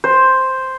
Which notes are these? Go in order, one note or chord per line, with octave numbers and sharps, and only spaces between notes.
C5